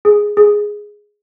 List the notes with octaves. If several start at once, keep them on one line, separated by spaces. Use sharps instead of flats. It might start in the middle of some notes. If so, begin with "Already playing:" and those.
G#4
G#4